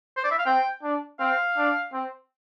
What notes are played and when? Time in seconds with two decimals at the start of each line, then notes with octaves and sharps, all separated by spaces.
0.17 C5
0.24 D5
0.31 E5
0.39 F5
0.46 C4 G5
0.83 D4
1.20 C4 F5
1.57 D4
1.93 C4